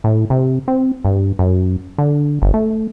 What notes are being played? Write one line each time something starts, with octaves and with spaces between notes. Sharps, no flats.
A2
C3
C4
G2
F#2
D3
G1
A3